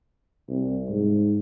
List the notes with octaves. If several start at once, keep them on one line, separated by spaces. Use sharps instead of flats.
C2
G#2